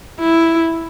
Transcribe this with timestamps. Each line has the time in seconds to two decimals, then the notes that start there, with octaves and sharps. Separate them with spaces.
0.20 E4